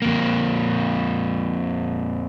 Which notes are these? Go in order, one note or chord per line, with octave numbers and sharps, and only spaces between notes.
F2 A#3